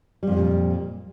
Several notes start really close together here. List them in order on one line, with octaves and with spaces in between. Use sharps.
G3 F2 C#3 A#2